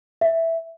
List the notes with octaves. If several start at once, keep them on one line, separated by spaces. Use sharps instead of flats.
E5